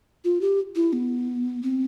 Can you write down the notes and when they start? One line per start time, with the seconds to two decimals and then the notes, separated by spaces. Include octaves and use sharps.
0.24 F4
0.41 G4
0.75 E4
0.93 B3
1.63 C4